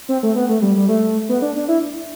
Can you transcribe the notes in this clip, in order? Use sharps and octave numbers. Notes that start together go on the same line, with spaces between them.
C4
A3
B3
A3
G3
G3
A3
B3
D4
D4
E4